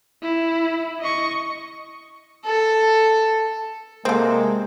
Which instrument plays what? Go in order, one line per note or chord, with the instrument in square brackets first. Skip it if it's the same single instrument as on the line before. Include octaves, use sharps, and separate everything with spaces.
[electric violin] E4
D#5 C#6
[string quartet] A4
[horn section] C3 A#3 [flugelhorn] G#3 [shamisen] C4 A4